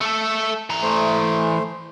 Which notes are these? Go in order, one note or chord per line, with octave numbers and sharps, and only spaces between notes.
A3 A4
E3 A#5
A3 C5